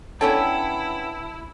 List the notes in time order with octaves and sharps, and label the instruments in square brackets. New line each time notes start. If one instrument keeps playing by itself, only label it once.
[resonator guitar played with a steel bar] B3 C#4 G5 [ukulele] D4 A4 C#5 [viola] E4 [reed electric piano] A5